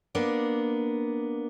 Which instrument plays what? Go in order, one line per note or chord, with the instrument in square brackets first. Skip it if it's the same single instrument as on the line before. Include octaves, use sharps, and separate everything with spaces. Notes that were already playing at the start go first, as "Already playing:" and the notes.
[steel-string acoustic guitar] A#3 B3 D4